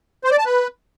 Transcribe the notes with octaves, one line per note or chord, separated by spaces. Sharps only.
C5
D5
A5
B4